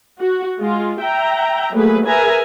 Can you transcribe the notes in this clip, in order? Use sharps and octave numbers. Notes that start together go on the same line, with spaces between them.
F#4
G#3 F4
E5 G5 A#5
F#3 A3 A#3 G#4 B4
G#4 A#4 B4 E5 G#5 A#5